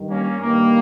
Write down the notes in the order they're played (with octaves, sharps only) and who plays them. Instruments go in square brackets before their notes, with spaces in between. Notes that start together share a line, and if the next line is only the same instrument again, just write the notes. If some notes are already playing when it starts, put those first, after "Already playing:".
Already playing: [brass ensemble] G2 D#3 G3
A#3 C#4
G2 D#3 G3 A#3